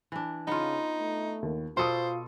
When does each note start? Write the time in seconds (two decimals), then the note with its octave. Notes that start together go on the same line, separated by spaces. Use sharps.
0.12 E3 D4
0.47 C#3 B3 D#4 F4
0.99 A3
1.42 D#2
1.77 B2 F4 A4 C5 D5 C6 D#6